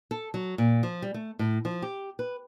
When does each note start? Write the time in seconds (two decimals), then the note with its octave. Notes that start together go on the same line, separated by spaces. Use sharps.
0.11 A4
0.34 F#3
0.58 A#2
0.83 F3
1.02 G3
1.14 A3
1.39 A2
1.65 F3
1.82 G4
2.19 B4